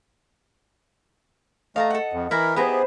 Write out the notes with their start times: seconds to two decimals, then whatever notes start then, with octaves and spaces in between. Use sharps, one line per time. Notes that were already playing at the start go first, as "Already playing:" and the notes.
1.76 A3 D#5 F5 A5 A#5
1.90 A4 F#5
2.13 F2
2.31 E3 E4 A#4 B4 A#5
2.56 B3 E4 G4 G#4 B4 C5 A#5